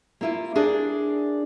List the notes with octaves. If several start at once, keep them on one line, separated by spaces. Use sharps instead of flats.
A#3 E4 F4
D4 G#4 A#4 D5